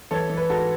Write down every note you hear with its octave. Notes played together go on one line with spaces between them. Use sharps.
E3 A4 C#5
E3
B4
G#2 F#4 A4